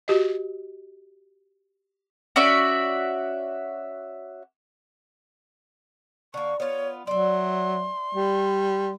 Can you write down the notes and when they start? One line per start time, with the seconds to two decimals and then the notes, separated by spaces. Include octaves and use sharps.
0.08 F#4 G4 D#5
2.36 C#4 F#4 D5 E5
6.34 D3 A#3 C#6
6.60 B3 F4 C#5
7.07 F#3 D5 E5 C6
8.15 G3